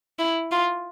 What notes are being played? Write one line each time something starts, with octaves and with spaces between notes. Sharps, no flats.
E4
F4